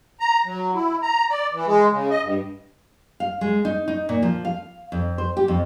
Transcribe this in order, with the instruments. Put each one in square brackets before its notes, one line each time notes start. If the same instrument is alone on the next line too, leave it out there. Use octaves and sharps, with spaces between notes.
[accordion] A#5
F#3
E4
A#5
D5
E3
G#3
C#3
D#5
G2
[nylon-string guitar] F5
G#3
D#4
D#4
A#2
F3
F5
F2
C5
G4
F2